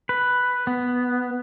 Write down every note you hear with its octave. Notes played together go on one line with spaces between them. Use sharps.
B4
B3